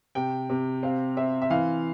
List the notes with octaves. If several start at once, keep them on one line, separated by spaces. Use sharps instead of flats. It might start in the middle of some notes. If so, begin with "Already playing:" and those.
C3 G5
C3
C4 F5
C4 E5
E5
E3 F5